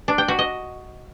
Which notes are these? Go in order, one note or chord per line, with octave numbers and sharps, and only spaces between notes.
D4
G5
F#4
D#5